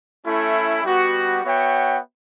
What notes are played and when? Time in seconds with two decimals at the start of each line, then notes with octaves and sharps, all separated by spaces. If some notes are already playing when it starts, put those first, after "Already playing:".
0.24 A3 C#4 E4
0.83 G3 B3 F#4
1.43 B3 F#4 C#5 E5 G5